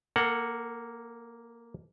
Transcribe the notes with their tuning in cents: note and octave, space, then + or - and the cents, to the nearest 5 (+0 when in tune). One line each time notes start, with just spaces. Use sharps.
A#3 +0 A4 +35 F#5 +0